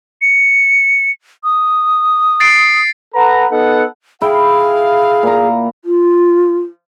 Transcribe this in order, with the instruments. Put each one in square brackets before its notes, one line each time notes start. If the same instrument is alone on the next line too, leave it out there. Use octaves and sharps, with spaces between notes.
[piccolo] C#7
D#6
[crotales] A6 C7 D7
[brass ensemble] A4 B4 F#5 A#5
B3 D#4 A4 F#5
[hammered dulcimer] E4 G5 [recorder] G#4 [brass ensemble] F5
[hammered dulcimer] A#2 A#5
[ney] F4